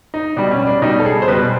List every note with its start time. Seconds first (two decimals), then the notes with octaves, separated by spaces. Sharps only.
0.14 D#4
0.36 B2 G3 D4
0.51 C#4
0.62 C#4
0.67 D4
0.82 B2 G3 D#4
1.00 A4
1.05 G#4
1.22 C5
1.27 B2 G3 B4